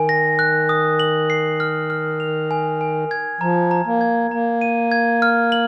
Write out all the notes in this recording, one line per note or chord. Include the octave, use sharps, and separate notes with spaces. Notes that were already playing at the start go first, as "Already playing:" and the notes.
Already playing: D#3 G#5
A#6
F#6
D#6
F#7
C7
F6
F6
F7
G#5
G#5
G#6
F3 A#5
A#5
A#3
G#6
A#3 A#5
D#7
G#6
F6
F#7